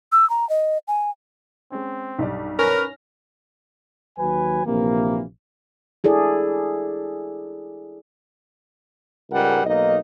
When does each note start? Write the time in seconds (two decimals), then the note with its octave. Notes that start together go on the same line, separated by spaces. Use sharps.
0.12 E6
0.30 A#5
0.50 D#5
0.88 G#5
1.72 G#3 C4 C#4
2.19 B1 G2 D5
2.59 C#4 A#4 B4 F6 A#6
4.19 D#2 F#3 B4 G#5
4.65 A#1 C3 E3 A#3
6.04 E4 G#4 A4 D5
9.30 C#2 G#2 G3 G#4 A#4 F#5
9.65 B1 A#3 D#4 D#5